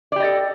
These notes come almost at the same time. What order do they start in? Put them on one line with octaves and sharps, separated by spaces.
D5 G4 D#5 A4